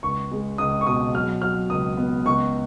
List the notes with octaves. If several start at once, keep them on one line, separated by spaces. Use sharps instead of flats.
C#2 C#6
G#3
C#2 D#6
C#6
B2 D#6
F#3 F6
F#3 F6
C#2 D#6
B3
C#2 C#6